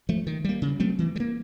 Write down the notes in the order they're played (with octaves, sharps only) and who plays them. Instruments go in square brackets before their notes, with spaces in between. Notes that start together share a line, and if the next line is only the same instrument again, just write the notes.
[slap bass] F3 A3
D#3
G3 A#3
C#3
F#3 A3 C4
E3
G3
A#3